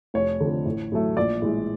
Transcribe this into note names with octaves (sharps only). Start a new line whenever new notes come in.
F1 C#5
F2 D3
A1
A2 F#3 A3
A#1 D5
A2 E3 G#3